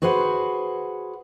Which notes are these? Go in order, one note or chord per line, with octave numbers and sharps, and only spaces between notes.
F#4 G#4 B4 C5 F5 F#5